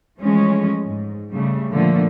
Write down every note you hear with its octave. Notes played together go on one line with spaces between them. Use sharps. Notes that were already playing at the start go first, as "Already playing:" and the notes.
E3 F3 G#3 A3 C#4
G#2
C#3 G3 A3
A#2 D3 F3 A3 A#3